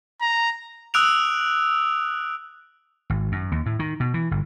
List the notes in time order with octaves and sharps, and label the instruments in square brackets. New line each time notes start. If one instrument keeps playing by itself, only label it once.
[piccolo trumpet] A#5
[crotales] D#6 E6 F#6 D7 F7
[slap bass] G#1
F#2
D#2
A2
D#3
B2
E3
G1